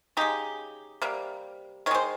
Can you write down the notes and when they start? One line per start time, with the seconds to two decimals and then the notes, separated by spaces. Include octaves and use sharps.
0.17 C#3 G#3 D#4 G4
1.01 C3 G3 A#3
1.86 D#3 C#5
1.91 G#3 C5